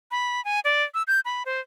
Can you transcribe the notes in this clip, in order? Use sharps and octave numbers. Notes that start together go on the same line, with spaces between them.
B5
G#5
D5
E6
G6
B5
C5